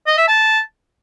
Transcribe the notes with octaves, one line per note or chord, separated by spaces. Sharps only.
D#5
E5
A5